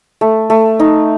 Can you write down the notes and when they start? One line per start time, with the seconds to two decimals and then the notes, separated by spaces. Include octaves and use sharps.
0.21 A3
0.50 A3
0.80 D#4